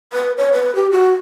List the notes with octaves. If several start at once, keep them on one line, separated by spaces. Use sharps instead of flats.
B4
C#5
B4
G4
F#4